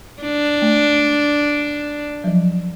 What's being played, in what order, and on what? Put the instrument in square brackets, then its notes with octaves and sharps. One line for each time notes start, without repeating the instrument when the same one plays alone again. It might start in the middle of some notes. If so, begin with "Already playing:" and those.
[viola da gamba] D4
[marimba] A3
F3 F#3